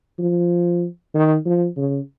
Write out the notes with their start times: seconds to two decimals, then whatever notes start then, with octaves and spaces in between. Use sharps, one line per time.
0.19 F3
1.14 D#3
1.46 F3
1.77 C#3